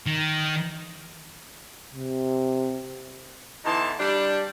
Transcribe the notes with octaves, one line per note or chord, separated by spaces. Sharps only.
D#3
C3
D3 E3 B3 D#4 A5 C6
G3 D4